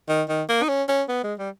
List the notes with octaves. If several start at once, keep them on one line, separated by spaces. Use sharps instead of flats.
D#3
D#3
A#3
D#4
C#4
C#4
B3
G#3
G3